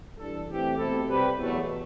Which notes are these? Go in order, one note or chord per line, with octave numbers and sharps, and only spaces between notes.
E3 G3 D4 A4
E3 A3 C4 G4
B2 A3 C4 E4 A4
C3 G3 C4 G4 B4
E2 B2 F#3 A3